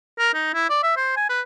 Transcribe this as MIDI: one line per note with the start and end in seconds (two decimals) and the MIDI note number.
0.19 0.30 70
0.34 0.51 63
0.54 0.66 64
0.69 0.81 74
0.83 0.94 76
0.96 1.12 72
1.16 1.26 80
1.29 1.41 71